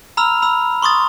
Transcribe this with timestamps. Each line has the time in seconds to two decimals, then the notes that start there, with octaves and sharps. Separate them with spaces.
0.17 A#5 B5 E6 F6 F7
0.42 B5 E6
0.82 C6 C#6 D#6 A6